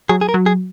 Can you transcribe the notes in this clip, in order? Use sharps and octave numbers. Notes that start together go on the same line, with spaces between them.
F#3 G#4
G#4
A#4
F#3
G#4